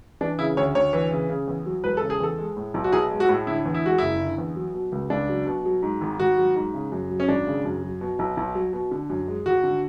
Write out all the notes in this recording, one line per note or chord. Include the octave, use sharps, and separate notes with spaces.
E3 D4
C#3 E4
D2 C#5
D2 C#5
E3
C#3
C#3
E2
F#3
E1 B4
A4
C#3
G#4
E2 A4
G#3
A2
B1
F#4
B1 G#4
G#3
F#4
A2
D3 E4
E2
E4
G#3 F#4
F#1 E4
D3
E2
F#3
B2
C#2
C#2 D4
F#3
B2
F#3
G#2
G#1
G#1 F#4
F#3
G#2
C#3
F#2
F#3
C#4
G#1 D4
C#3
F#2
F#3
B2
B1
B1
F#3
B2
D3
F#2
G#3
G#1 F#4
D3